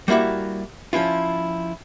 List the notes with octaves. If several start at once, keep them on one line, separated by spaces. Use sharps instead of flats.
G3 A#3 E4 F#4 E5
F3 C#4 E4 F4